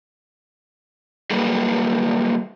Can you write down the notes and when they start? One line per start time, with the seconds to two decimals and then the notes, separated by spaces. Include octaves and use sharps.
1.30 F#3 G3 A#3 G#4 A4 B4